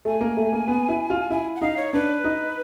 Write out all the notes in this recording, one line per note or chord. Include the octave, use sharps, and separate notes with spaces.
A3 G#5
A#3
A3
A#3
B3
E4
F4
E4 G#5
F#5
D#4 F5
C#5
D4 B4
D#4